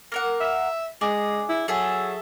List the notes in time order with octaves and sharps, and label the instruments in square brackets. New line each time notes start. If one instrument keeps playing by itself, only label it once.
[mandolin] A#3 A#4 F#5
[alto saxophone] E5
[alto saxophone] G#3 [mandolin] D4 G#4
[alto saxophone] E4
[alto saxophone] F#3 [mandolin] G#4 A4 E5